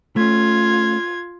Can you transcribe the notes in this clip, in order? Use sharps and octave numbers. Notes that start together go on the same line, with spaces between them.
A3 C#4 F4 G#6